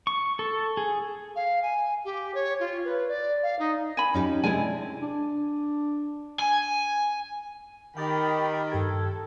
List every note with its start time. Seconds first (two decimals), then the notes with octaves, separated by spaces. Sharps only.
0.07 C#6
0.39 A4
0.77 G#4
1.36 F5
1.62 G#5
2.05 G4
2.34 C#5
2.60 F4
2.85 B4
3.08 D5
3.43 F5
3.59 D#4
3.97 G#5 B5
4.14 C#4 D#4 G4
4.44 C3 G#3 D4 E4 G#5
5.01 D4
6.39 G#5
7.97 D#3 G4 G5 B5 D6 A6
8.72 G2 G4 A4 G#6